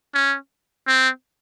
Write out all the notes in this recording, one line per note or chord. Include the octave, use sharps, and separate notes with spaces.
C#4
C4